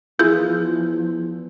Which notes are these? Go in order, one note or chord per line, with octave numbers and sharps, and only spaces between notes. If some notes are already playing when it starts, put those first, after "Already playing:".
E2 F3 E4 F4 G#4 G6